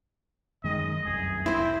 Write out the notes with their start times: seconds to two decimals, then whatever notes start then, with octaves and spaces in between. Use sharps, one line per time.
0.64 F#2 D#3 G#3 D#5
1.05 F1 C2 F#2 G#4
1.46 C4 E4 C5